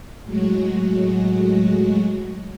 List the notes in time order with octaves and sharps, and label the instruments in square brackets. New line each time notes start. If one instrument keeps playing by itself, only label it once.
[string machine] A2 F#3 G#3 F#4